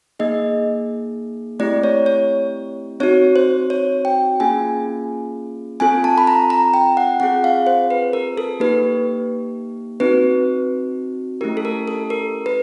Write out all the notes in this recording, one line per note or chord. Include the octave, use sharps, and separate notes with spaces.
A#3 D#4 G#4 D#5
A3 C4 E4 G4 D5
C#5
C#5
C4 D#4 F#4 C#5
C5
C#5
G5
A#3 C#4 F4 G#4 G#5
C4 F4 A4 G#5
A5
B5
A#5
A#5
G5
F#5
C4 F4 G#4 F#5
F5
C5
B4
A#4
A4
A#3 D#4 G4 B4
C4 D#4 F#4 B4
A3 C#4 E4 G4 A#4
A4
A#4
A4
A#4
B4